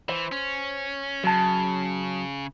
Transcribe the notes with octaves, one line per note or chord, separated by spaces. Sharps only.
E3 C5
C#4
C#3 F#3 A5